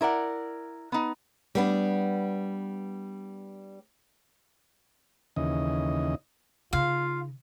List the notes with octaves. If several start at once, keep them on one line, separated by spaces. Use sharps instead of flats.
E4 A#4 D5 F#5
B3 D#4
G3 B3 D4
D#2 C#3 E3 D#5
C#3 D#4 F4 F5